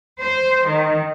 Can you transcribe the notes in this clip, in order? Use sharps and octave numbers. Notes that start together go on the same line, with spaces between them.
C5
D#3